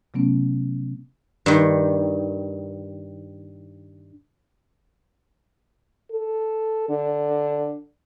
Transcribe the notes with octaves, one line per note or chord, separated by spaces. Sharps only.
C3 F#3 A3 B3 C#4
G2 D#3
A4
D3